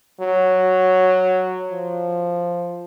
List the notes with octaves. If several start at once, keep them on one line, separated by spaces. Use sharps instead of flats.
F#3
F3